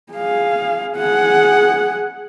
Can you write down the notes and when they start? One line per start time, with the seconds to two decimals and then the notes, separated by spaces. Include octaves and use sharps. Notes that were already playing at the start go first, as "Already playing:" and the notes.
0.13 G#4 F5
0.96 G#4 F#5